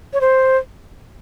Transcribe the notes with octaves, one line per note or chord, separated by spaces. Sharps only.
C#5
C5